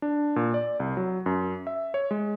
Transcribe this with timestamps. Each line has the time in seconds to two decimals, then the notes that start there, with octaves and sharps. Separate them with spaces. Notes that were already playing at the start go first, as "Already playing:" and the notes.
0.02 D4
0.36 A#2
0.54 D5
0.80 C2
0.97 F#3
1.26 F#2
1.67 E5
1.94 C#5
2.11 G#3